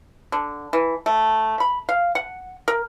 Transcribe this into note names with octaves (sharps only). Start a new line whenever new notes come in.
D3
E3
A3
B5
F5
F#5
A#4